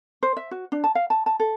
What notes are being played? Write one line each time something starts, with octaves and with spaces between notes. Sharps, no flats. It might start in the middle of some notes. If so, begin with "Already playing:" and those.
C5
E5
F#4
D4
A5
F5
A5
A5
A4